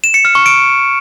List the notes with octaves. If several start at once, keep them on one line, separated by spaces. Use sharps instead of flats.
E7
C#7
F6
C#6
D7